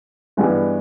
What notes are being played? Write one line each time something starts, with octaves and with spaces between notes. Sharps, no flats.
G2 E3 G#3 B3 E4